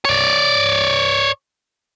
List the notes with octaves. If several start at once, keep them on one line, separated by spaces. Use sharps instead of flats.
C#5 D5